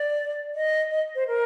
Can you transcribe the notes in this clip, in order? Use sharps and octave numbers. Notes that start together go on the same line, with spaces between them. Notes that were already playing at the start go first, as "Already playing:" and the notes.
Already playing: D5
D#5
D#5
C5
A#4